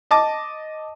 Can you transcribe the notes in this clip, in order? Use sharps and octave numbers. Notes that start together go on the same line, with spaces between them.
D#5 A5 D6